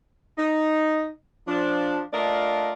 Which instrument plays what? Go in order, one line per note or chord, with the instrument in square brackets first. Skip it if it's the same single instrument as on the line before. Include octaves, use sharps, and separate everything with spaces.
[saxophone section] D#4
F3 D4
A3 D4 F4 A#4 D5 D#5